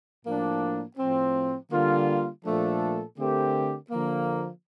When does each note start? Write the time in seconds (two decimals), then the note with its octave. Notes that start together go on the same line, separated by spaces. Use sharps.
0.24 A2 F3 A#3 D4
0.97 A2 F3 C4
1.70 D3 G3 A#3 F4
2.44 A#2 F3 A3 D4 A4
3.17 D3 A3 C4 G4 A#4
3.90 D3 F3 A#3